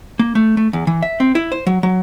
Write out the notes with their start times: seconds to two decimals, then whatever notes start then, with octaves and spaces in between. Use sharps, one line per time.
0.19 A#3
0.35 A3
0.57 A3
0.73 E2
0.87 E3
1.02 E5
1.20 C4
1.35 E4
1.52 C5
1.67 F#3
1.83 F#3